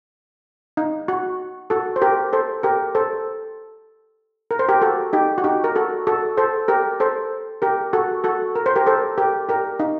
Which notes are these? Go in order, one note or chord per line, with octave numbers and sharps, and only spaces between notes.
D#4
F#4
F#4 A4
C5
G4 A#4
A4 C5
G4 A#4
A4 C5
A#4
C5
G4 A#4
F#4 A4
D#4 G4
F#4
D#4 G4
A#4
F#4 A4
F#4 A4
A4 C5
G4 A#4
A4 C5
G4 A#4
F#4 A4
F#4 A4
A#4
C5
G4 A#4
A4 C5
G4 A#4
G4 A#4
D#4